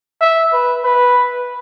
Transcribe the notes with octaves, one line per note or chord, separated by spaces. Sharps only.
E5
B4
B4